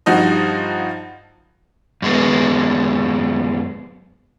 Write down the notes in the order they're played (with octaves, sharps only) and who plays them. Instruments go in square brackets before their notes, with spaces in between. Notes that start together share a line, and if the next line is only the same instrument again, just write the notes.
[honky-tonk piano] G2 F3 D#4 F#4 D#5
[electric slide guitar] F#2 G#3 B3